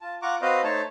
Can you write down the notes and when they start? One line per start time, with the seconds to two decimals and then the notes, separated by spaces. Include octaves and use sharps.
0.01 F4 A5
0.22 F4 F#5 A#5 C#6 D6
0.42 C4 F#4 B4 C5 D#5 F5
0.64 A3 D#4 C5 C#5 A5